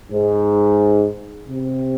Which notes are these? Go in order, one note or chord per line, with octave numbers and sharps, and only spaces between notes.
G#2
C3